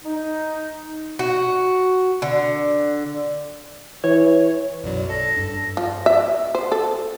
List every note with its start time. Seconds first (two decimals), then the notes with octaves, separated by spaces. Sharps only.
0.04 D#4
1.19 F#4
2.22 D3
4.04 E3 C#5
4.83 B1 F#2 F#3 D5
5.09 A4 A#6
5.37 G2 D4
5.77 F3
6.06 E5
6.55 C5
6.72 A4